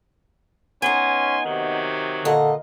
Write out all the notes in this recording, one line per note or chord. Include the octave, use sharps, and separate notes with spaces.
B3 C#4 D#4 G#5 C6
C3 D#3 F#3
A#2 D3 D#5